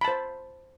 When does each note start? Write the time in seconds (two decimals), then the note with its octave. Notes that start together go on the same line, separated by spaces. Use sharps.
0.01 B5
0.05 A5
0.08 C5